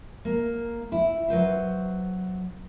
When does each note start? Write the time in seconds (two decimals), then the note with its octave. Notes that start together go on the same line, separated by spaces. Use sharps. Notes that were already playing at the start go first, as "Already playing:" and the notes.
0.25 A#3
0.92 E4
1.28 F#3 B4 C5 E5